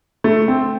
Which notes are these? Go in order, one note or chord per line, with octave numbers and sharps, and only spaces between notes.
A3
C4